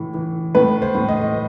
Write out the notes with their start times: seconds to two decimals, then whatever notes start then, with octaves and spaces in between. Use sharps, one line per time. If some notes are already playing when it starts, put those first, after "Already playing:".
Already playing: A2 E3
0.14 E3
0.55 A2 B4
0.82 C5
0.95 A2
1.09 D#5